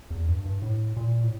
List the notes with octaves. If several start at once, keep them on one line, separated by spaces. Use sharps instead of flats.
E2
G2
G2
A2
A#2
A2